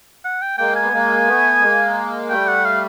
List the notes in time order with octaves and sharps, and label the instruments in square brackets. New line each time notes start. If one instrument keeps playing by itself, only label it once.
[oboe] F#5
G5
[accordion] G#3 A#3 [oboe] G5
[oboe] G#5
[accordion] B3
G#3 A#3
A3 B3
G#3 A#3
[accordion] G3 A3 [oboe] G5
[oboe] F#5
F5